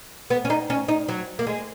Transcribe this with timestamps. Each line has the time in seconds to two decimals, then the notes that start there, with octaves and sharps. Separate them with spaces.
0.30 B3
0.45 C#4
0.50 D#4
0.70 C#4
0.88 D#4
1.09 F#3
1.39 A#3
1.47 G#3